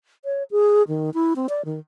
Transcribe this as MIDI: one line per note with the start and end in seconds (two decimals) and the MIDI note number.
0.25 0.43 73
0.51 0.83 68
0.88 1.10 51
1.14 1.33 64
1.36 1.47 60
1.49 1.64 74
1.65 1.79 51